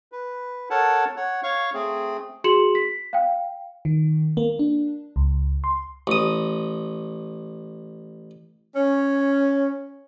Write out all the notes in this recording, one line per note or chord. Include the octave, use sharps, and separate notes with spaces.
B4
A4 A#4 C#5 F#5 A5
C#5 F#5
C#5 F5 C#6
A3 C4 G#4
F#4 G#4 C6 C#7 E7 F#7
B6
F5 G5
D#3
A#3
D4
C#2
C6
A1 D#6
C#4